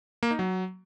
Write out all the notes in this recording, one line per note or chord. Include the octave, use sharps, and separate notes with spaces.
A#3
D#4
F#3